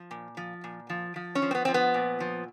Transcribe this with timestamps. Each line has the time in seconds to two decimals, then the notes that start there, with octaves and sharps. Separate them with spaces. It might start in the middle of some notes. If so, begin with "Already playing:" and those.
Already playing: F3
0.11 A#2
0.37 F3
0.64 A#2
0.90 F3
1.16 F3
1.35 C#4
1.42 F3
1.51 C4
1.55 B3
1.65 F3 C4
1.74 B3
1.94 A#2
2.20 F3